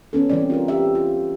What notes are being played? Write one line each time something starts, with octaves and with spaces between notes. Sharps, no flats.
E3 B3 C#4 A4
E3 G3 C4 D5
F4 G#4 A#4
G4 E5
F4